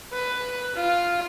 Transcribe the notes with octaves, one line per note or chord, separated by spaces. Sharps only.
B4
F4